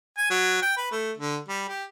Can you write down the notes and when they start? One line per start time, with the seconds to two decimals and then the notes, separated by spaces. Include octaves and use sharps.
0.18 G#5
0.30 F#3
0.62 G5
0.77 B4
0.92 A3
1.17 D3
1.48 G3
1.68 G4